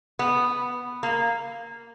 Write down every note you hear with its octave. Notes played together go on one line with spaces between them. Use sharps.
B3
A#3